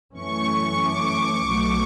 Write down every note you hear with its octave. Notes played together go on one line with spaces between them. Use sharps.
F#2 E3 A3 C#4 C#6
D6
B1 B2 F#3 A3